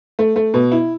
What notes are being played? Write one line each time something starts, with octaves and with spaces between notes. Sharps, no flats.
A3
A3
B2
E4